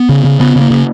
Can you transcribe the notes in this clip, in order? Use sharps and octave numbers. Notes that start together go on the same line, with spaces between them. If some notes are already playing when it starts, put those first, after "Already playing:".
Already playing: B3
C#3
C#3
C#3 B3
C#3 A#3
C#3